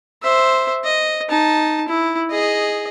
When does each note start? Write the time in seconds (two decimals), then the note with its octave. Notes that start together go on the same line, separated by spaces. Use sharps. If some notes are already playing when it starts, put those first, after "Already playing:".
0.22 C5 E5
0.84 D#5
1.29 D#4 A5
1.88 E4
2.30 G#4 D#5